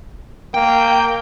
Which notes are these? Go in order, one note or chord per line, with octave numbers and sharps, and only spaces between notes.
A#3 G5